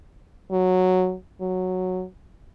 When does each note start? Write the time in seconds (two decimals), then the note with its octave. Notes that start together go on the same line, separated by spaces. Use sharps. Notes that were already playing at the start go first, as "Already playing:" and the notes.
0.51 F#3
1.41 F#3